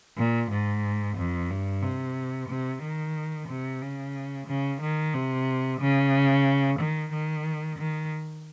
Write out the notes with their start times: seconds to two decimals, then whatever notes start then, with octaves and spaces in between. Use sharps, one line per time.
0.17 A#2
0.51 G#2
1.17 F2
1.51 G2
1.82 C3
2.49 C3
2.83 D#3
3.49 C3
3.81 C#3
4.47 C#3
4.81 D#3
5.14 C3
5.80 C#3
6.79 D#3
7.13 D#3
7.79 D#3